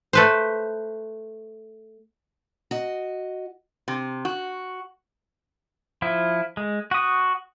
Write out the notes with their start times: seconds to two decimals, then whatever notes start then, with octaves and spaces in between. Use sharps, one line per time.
0.13 A3 B4 C5
2.71 F#4 D#5
3.88 C3
4.25 F#4
6.02 F3 E4
6.57 G#3
6.91 F#4 D#6